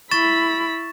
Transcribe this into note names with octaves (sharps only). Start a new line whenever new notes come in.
E4 B5 C#6 A6 E7